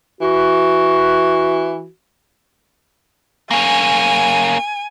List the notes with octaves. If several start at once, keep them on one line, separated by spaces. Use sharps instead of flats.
E3 F#4
A#3 C#4 G#5